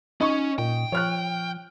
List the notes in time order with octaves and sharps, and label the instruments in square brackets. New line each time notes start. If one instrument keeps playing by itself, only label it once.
[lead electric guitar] C#4 [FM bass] D#4 [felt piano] D#5 C#6
[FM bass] A#2 [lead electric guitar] G5
[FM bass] F3 [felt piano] C#5 F6 F#6